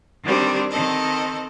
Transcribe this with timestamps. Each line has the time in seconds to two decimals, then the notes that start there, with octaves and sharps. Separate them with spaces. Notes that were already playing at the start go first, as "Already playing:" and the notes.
0.24 D#3 G3 C4 D4
0.70 D#3 C4 A4 D#5